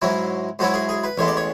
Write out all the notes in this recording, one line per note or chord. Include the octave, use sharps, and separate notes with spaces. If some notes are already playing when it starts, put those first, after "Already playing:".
G#2 F#3 C#4 E4
G#2 F#3 C#4 E4 F#4
G#4
G#4
B4
A1 A2 G#3 B3 C#5
D5
C#5